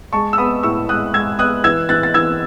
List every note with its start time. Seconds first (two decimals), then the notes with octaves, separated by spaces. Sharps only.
0.13 G#3 A5 C#6
0.33 E6
0.38 B3 B5 D#6
0.63 A2 C#6 E6
0.89 G#3 D#6 F#6
1.14 G#3 E6 G#6
1.39 B3 D#6 F#6
1.64 E3 E6 G#6
1.89 E3 F#6 A6
2.03 A6
2.14 E3 E6 G#6